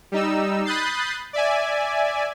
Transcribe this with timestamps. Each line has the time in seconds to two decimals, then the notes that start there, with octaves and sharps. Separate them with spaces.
0.12 G3 D#4 E6
0.65 B5 D#6 F#6 G6 A6 C7
1.33 D5 E5 G#5